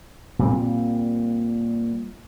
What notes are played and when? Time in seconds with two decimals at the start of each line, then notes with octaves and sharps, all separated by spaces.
0.39 A#2 G3 C4